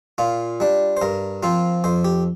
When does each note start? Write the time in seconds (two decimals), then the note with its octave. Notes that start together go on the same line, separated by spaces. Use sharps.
0.18 A#2 F4
0.60 G3 D4
0.97 C5
1.02 G2 A#4
1.43 F3 C4 F4
1.84 F2 C5
2.04 G4